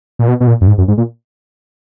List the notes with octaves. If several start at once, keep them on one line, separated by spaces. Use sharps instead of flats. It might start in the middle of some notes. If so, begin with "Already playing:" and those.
A#2
B2
B2
A#2
F#2
G#2
F#2
G#2
A#2